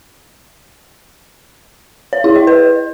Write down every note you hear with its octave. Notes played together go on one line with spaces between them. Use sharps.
C#5
E4
D#5
B4